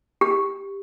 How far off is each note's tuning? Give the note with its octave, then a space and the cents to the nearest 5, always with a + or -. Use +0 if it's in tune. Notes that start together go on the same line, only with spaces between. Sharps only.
G4 +10